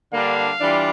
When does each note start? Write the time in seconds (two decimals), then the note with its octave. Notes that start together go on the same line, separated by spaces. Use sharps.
0.13 D3 G3 A#3 D4 F5
0.60 E3 G3 D4 F4